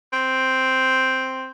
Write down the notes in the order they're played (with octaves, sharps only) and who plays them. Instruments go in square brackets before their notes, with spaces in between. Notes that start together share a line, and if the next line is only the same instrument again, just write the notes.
[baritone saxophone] C4